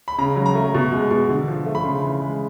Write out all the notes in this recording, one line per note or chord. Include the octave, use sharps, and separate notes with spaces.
B5
C#3 A#5
F#3
A#5
A3
B2
G#3
B2
D3
F3
A3
B5
C#3 C6
E3
B5
G#3